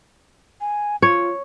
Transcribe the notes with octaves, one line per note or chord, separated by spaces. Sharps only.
G#5
F4 C#5